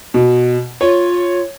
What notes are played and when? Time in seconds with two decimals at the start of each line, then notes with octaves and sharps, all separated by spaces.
0.14 B2
0.81 F4 C#5